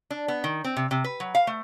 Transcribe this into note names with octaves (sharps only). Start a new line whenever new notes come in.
D4
B3
D#3
C4
C3
C3
B4
F#3
F5
A3